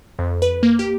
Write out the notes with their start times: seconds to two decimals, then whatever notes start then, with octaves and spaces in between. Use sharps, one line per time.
0.19 F2
0.42 B4
0.63 A#3
0.79 G4